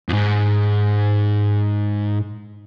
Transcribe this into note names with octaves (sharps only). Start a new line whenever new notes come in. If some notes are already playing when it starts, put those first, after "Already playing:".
F2 G#2